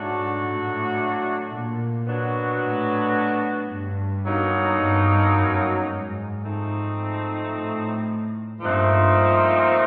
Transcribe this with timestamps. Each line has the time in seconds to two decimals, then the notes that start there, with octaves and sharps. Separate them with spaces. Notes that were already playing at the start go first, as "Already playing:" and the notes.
Already playing: G#2 D3 F#3 A3 D4 F#4
0.42 A2
1.51 A#2
2.05 B2 F#3 B3 D4 F#4
2.60 A2
3.68 G2
4.23 B2 F#3 A#3 D#4
4.78 G2
5.32 F#2
5.86 G#2
6.41 F3 A3 C4 D#4
7.50 A2
8.59 G2 A#2 F3 A3 C4 D#4